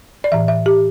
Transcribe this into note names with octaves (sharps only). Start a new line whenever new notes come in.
D5
A2 E3 E5
E5
G4